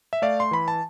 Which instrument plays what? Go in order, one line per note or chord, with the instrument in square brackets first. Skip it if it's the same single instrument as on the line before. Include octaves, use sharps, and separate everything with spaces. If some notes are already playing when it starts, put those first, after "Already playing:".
[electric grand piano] E5
A3 D5 F5
C6
E3 B5
A5